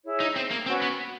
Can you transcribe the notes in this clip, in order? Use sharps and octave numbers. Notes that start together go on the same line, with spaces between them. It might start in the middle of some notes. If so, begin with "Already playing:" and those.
E4 G#4 C#5
D#4
C4
A#3
C4 C#4 F#4 B4
B3